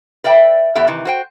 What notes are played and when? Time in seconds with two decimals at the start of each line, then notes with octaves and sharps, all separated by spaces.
0.24 B4 D5 E5 G5
0.75 E2 A3 B3 G4 E5
0.87 C3 D#3 E3
1.05 F#4 C5 G5